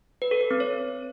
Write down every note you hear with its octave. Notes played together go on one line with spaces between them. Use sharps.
B4
A4
B4
C4
C#5